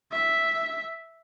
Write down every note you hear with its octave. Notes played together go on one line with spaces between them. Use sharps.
E5